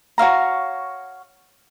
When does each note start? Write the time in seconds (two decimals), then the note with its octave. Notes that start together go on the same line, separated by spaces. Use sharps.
0.18 F#4 C#5 F5 A#5